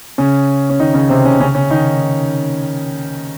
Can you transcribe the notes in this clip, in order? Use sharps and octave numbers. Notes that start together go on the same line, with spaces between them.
C#3 C#4
C#4
D#3 D#4
C#3 C#4
C3 C4
C#3 C#4
C#3 C#4
C#3 C#4
D#3 D#4